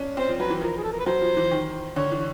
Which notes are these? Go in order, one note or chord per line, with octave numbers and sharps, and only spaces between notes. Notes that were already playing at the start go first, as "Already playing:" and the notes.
Already playing: C#4 D4
C4 C5
F3
F#3 B4
E3
F3 A#4
G#4
A4
A#4
B4
F#3 C5
F3
E3
D#3
D3 C#5
E3